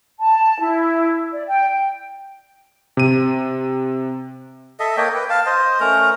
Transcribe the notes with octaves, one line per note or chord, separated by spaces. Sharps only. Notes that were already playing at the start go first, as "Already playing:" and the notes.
A5
E4
D5
G5
C3 D#7
A4 D#5 E5
A#3 C#5 D#5 G5
B4 G5
F5 A5
C5 D#5
A3 C#4 A#4 A#5